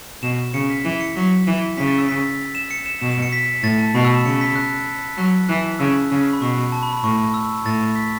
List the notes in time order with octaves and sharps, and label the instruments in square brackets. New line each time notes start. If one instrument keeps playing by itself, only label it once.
[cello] B2 [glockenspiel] E7
[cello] C#3 [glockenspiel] C#7
[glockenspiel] B6
[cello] E3
[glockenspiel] C#7
[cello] F#3 [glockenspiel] C#7
[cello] E3
[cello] C#3 [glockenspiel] B6
[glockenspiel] A6
E6
B6
E7
C#7
E7
[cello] B2 [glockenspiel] E7
[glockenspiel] E7
C#7
B6
[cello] A2 [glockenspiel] A6
[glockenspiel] A5
[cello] B2 [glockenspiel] B5
[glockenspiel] E6
E7
[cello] C#3 [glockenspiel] C#7
[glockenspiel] B6
F#6
[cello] F#3 [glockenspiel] F#6
[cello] E3 [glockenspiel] F#6
[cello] C#3 [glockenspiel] E6
[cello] C#3 [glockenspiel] E6
[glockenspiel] B5
[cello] B2 [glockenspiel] C#6
[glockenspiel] A5
B5
B5
[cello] A2 [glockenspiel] C#6
[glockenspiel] E6
[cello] A2 [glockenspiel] A6
[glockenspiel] B6